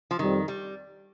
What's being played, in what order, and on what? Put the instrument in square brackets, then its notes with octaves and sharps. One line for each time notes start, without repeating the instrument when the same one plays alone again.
[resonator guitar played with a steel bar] F3
[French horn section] F2 C3 G3 [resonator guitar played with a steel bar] D#3
[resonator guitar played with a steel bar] G3